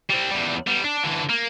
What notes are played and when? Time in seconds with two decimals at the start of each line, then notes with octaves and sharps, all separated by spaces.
0.10 G3 C4
0.31 E2 G3
0.67 G3 B3
0.84 D4
1.04 D3 E3
1.30 A#3